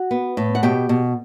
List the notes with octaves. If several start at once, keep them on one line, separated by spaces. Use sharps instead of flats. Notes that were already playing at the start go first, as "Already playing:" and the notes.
Already playing: F#4 F#5
B3
A2
F#5
B2 G4 G5
B2